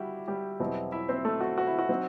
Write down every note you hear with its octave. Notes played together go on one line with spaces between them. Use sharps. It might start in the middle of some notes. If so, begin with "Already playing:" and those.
Already playing: G3 E4 F#4 G4
G3 G4
E2 B2 F#3 C4 E4
E4 E5
C4 C5
A3 A4
F#4
F#4
E4
F#4
F#3 C4 D#4